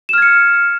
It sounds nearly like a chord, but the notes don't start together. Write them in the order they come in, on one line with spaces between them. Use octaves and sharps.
E7 F6 G#6 C#7